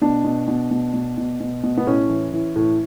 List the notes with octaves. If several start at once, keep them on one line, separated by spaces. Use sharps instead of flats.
B2 D4
B2
B2
B2
B2
B2
B2
B2
B3
A2 C#4
E3
E3
A2